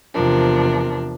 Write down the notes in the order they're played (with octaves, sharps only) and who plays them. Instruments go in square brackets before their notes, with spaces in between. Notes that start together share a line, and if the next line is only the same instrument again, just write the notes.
[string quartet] E2 C3 F3 D4 A#4